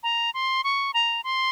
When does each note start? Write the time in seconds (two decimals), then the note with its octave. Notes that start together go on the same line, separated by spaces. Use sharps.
0.03 A#5
0.34 C6
0.64 C#6
0.94 A#5
1.24 C6